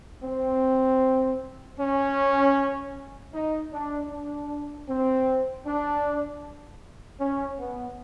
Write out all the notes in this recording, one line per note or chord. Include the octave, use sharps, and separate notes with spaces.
C4
C#4
D#4
D4
D4
C4
D4
C#4
B3